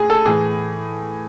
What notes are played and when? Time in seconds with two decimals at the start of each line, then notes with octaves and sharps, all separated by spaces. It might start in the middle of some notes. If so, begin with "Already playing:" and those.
Already playing: A2 G#4
0.10 A4
0.26 A2 E3 G#4